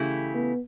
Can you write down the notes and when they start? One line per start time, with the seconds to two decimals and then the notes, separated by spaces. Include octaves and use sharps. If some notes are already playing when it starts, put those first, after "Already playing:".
Already playing: C#3 E3 A3 E4 G4
0.34 B3